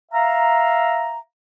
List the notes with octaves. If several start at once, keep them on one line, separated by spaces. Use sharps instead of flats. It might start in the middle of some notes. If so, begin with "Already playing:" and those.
E5 F5 A#5